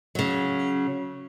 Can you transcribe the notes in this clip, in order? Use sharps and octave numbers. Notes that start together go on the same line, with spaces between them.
C#3 F#3